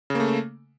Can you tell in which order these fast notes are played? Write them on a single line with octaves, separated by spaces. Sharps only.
C#3 A#3 A3